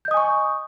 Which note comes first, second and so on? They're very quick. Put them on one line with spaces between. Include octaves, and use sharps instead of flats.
G6 D#5 D#6 G#5 C#6